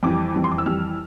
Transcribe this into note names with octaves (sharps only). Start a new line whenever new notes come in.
F2 E3 G3 D6
F2 E3 G3
C6
D6
E6
F2 E3 G3 F6